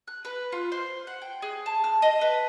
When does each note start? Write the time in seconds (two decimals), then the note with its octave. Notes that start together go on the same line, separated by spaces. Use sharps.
0.08 F#6
0.25 B4
0.52 F4
0.72 C5
1.07 F#5
1.22 G5
1.42 G#4
1.66 A5
1.84 F6
2.02 D#5
2.21 B4